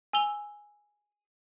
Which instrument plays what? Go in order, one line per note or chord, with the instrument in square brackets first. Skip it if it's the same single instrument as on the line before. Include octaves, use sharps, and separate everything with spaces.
[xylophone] G#5 E6 F7 G7